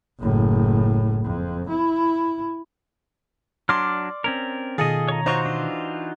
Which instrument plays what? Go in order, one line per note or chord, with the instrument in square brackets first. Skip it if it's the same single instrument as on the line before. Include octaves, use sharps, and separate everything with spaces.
[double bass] F#1 A2
F2
E4
[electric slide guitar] F#3 D4 [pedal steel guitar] D5 D6 F6 [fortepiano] C6
[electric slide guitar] C4 C#4 A#4
[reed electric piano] B2 D#3 [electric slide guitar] F4 A4 D#5 [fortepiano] G#4
[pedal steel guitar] C#5 A#5
[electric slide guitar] D#4 F4 F#4 [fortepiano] C5 C#6
[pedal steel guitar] E3 D4